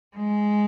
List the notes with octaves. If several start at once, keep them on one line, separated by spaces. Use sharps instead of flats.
G#3